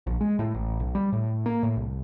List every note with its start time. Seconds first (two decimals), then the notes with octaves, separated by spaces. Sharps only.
0.07 A#1
0.21 G#3
0.39 A2
0.54 A1
0.80 B1
0.95 G3
1.12 A2
1.46 A#3
1.63 A2
1.77 C2